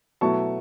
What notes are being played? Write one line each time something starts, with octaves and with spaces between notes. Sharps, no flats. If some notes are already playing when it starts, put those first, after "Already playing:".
B2 F#3 A3 E4 A5 C#6